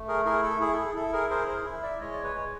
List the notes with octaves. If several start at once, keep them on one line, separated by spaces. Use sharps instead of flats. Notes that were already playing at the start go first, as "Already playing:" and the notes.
Already playing: A3
G#4 A#4
E4 G#4 A#4
A4
E4 G#4
A4
G#4
E4 A4
G#4 A#4
G#4 A#4 C5
A#4 C5
E4
D5 E5
G#3 C#5 D#5
D5
B4 C#5
G#3